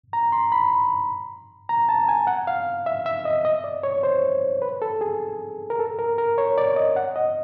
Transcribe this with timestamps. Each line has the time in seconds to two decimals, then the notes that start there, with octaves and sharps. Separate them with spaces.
0.13 A#5
0.32 C6
0.52 B5
1.69 A#5
1.89 A5
2.09 G#5
2.27 F#5
2.47 F5
2.86 E5
3.06 E5
3.25 D#5
3.45 D#5
3.64 D5
3.83 C#5
4.03 C5
4.62 B4
4.82 A4
5.01 G#4
5.70 A#4
5.79 A4
5.99 A#4
6.18 A#4
6.38 C#5
6.58 D5
6.76 D#5
6.96 F#5
7.16 D#5